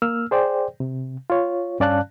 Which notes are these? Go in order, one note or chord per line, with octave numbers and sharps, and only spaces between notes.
A#3 E6 F6
G#4 C5 D5 G5
C3
F4 C#5
G2 C#4 D5 F5 A5 F#6